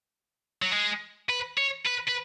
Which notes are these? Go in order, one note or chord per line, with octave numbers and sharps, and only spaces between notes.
F#3
G#3
B4
C#5
B4
B4